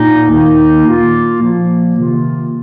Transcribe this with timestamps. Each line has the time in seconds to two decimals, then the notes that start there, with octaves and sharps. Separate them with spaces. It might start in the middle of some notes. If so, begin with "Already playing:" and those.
Already playing: A#2 A#3 D#4
0.30 D#2 D#3 A#3 D#4
0.86 A#2 A#3 F4
1.41 A#2 F3 A#3
1.96 C3 D#3 A#3 F4